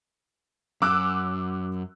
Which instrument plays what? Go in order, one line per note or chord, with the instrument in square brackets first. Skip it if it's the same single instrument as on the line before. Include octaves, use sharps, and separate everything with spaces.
[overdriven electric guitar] F#2 [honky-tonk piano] D6 E6 F#6